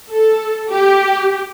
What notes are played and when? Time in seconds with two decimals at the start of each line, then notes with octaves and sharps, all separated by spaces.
0.12 A4
0.72 G4